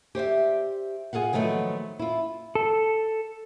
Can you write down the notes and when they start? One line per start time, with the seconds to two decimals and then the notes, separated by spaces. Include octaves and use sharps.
0.15 G4 C5 D5 E5
1.13 F4 G#4 A4 F5 F#5
1.33 D#3 F3 F#3 A3 B3
1.99 E4 F4
2.55 A4